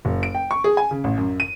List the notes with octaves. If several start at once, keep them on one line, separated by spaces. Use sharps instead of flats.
F#1
D7
G5
C#6
G#4
G#5
C#3
A1
F#2
D#7